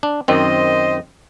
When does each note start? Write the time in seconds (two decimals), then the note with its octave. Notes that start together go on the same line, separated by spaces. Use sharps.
0.03 D4
0.28 F#2 D#3 C4 C5 D#5